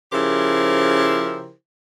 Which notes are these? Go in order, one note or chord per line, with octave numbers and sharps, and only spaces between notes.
C#3 F3 E4 G4 A#4 C5